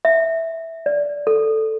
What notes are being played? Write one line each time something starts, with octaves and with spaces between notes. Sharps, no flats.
E5
D5
A4